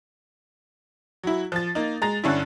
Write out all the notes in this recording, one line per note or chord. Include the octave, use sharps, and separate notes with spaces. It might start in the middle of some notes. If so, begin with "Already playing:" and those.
F#3 E4
F3 A6
A#3 D#4
G#3 A#5 A6
G2 D3 C#4 D4 E4